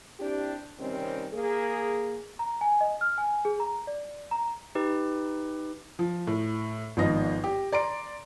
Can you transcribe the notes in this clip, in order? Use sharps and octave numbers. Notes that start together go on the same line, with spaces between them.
C4 D4 E4 G4
C3 D#3 G3 C4 C#4
A#3 G#4
A#5
G#5
D#5
F6
G#5
G#4
A#5
D5
A#5
D#4 G4 B4
F3
A2
G#1 F3 B3 D#4 A#6
G4
D5 A#5 C6 D7